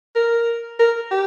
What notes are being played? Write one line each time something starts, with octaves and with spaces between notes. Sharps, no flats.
A#4
A#4
G4